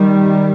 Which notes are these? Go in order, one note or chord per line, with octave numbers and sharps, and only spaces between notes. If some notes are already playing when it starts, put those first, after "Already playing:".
Already playing: D#3 G3